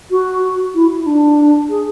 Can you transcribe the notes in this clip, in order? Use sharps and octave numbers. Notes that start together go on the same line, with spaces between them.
F#4
E4
E4
D4
G#4